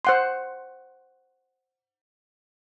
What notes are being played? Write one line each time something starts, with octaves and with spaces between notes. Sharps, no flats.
C5 F#5 C6